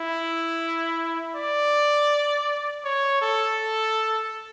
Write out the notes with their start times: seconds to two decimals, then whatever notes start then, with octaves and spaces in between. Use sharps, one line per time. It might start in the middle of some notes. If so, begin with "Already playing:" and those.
Already playing: E4
1.35 D5
2.85 C#5
3.22 A4